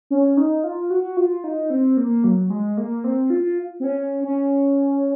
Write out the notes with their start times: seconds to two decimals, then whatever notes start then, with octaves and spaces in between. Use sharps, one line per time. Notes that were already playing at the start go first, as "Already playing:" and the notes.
0.11 C#4
0.37 D#4
0.64 F4
0.90 F#4
1.17 F4
1.44 D#4
1.70 C4
1.97 A#3
2.24 F#3
2.50 G#3
2.77 A#3
3.04 C4
3.30 F4
3.80 C4
3.84 C#4
4.24 C#4